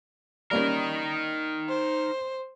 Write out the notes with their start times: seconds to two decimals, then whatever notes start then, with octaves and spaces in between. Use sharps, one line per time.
0.51 G3 A#3 C#4 D#4 A#4
1.69 C5